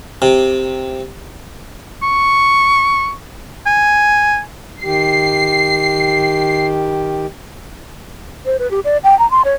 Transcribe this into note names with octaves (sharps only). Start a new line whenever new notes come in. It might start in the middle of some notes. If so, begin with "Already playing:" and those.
C3
C#6
G#5
D#3 G4 C7
C5
B4
G4
D5
G5
A#5
C6
C#5